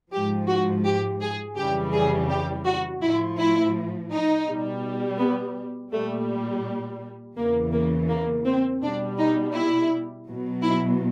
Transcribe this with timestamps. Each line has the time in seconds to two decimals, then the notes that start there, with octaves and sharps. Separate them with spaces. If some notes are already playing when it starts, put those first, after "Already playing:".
0.12 G#2 F3 G4
0.48 F#4
0.85 G4
1.22 G#4
1.57 F2 C#3 E3 G3 G4
1.93 G#4
2.30 G4
2.65 F#4
3.02 A2 F3 E4
3.39 E4
4.11 D#4
4.46 B2 G3
5.19 B3
5.91 A#2 G3 A3
7.37 E2 C#3 E3 A#3
7.72 A#3
8.09 A#3
8.45 C4
8.81 B2 G3 D4
9.18 D#4
9.54 E4
10.27 B2 F#3
10.62 E4